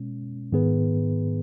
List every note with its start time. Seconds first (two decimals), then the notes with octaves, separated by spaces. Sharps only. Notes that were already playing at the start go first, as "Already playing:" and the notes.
Already playing: B2 G#3 C#4
0.53 G#2 D#3 B3 G#4 B4